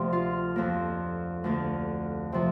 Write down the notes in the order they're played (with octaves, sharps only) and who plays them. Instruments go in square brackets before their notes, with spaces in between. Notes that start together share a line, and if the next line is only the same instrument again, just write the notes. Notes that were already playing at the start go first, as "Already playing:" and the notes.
Already playing: [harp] D2 C3 F3 A#3 G4
F4
F2 F3 A#3
D2 D3 A#3
C3 F3